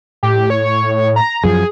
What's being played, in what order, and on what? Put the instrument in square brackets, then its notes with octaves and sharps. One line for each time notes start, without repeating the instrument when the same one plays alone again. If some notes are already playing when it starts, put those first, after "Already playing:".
[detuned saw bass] A2 [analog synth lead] G4
[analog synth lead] C#5
A#5
[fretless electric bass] F#2 F3 F#3 [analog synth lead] G#4